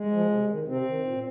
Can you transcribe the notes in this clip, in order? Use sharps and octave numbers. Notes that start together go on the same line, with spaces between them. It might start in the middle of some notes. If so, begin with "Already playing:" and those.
Already playing: G#3
F3
C3
D#3
C3 C4
D#3
A#2